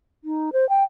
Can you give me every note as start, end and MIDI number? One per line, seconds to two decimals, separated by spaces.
0.24 0.50 63
0.53 0.68 72
0.69 0.84 79